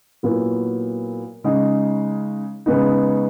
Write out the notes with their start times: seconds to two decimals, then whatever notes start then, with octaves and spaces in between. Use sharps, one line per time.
0.23 A#2 F#3 B3 E4
1.44 C#3 G#3 D#4
2.66 C#3 G#3 B3 D#4